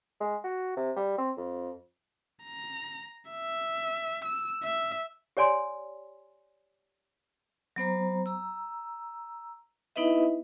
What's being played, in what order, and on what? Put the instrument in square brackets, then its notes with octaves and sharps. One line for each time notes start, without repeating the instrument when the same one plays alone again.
[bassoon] G#3
F#4
C3
G3
C4
F2
[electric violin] A#5
E5
E6
E5
[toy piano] G4 C#5 D5 G#5 C6
[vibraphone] F#3 B3 C5 A#5
A#5 E6
B3 D#4 E4 B4 D#5 E5